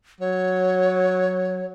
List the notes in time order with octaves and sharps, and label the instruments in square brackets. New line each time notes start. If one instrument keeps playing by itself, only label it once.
[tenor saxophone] F#3 [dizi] C#5